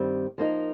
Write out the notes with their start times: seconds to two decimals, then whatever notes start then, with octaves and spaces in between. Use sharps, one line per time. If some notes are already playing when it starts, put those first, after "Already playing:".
Already playing: G2 D#3 G3 C4
0.38 F3 A#3 D#4 A#4